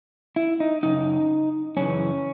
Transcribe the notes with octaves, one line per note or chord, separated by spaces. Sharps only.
E4
D#4
F#2 C#3 D#4
F#2 C#3 E3 C#4